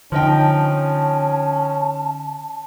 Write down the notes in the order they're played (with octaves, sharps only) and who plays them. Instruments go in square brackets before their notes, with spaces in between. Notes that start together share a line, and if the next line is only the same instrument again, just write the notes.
[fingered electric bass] D3 [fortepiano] F3 D#4 G5 [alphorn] C#4 [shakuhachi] A5